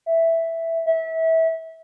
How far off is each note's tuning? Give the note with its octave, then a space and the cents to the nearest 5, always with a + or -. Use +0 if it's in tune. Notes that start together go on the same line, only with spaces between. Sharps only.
E5 +0
E5 -25